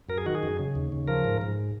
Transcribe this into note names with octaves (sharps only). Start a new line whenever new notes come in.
F#2 A#4
G#4
D#3 F#4
G#4
F#2
C#3
D#2
C#3
F3 A#4
G#2
G#2